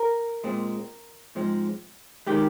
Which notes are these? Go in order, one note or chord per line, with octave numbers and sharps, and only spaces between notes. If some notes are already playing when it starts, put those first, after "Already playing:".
Already playing: A#4
A#2 G#3 C4
G#2 F3 G#3 C4
D#3 G#3 G4